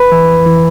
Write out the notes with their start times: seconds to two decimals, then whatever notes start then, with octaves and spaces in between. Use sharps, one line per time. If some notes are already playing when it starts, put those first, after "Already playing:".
Already playing: B4 B5
0.12 E3
0.29 F2
0.46 E3